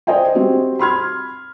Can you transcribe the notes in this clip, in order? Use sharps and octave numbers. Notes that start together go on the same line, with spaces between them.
C5 D5 D#5 G5 G#5
G3 C4 F#4 G4
B5 C6 F6 G#6